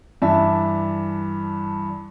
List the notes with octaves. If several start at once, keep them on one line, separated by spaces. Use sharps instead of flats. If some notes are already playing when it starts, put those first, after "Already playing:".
G2 E3 D4 E5 A5